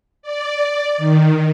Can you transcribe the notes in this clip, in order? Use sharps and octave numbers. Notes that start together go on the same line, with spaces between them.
D5
D#3